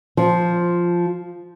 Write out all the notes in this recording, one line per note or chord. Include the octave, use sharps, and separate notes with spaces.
F3